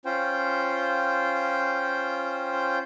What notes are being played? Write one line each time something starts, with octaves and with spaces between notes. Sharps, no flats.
C#4 F4 C5 G5